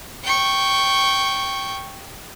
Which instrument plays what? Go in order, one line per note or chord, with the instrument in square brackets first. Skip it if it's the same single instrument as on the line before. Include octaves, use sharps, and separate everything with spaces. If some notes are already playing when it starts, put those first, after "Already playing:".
[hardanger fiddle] G5 C#6